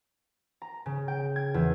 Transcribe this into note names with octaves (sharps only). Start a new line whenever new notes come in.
A#5
C#3
G5
G#6
E2